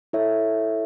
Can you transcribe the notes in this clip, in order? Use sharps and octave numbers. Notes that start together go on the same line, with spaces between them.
E4 A4 C#5 E5